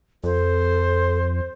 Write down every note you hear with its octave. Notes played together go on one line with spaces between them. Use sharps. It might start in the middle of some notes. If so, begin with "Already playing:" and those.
F2 A4 C5